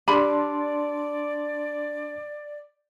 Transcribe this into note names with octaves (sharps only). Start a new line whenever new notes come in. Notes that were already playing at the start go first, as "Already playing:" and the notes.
D4 G4 D5 A5 B5 C6